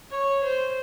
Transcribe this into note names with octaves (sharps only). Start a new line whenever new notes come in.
C#5
C5